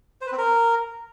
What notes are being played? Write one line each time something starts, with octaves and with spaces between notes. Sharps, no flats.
C5
B4
C4
A#4